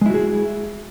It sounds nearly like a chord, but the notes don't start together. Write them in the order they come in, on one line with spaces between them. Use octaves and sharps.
G#3 E4 F#4 G#4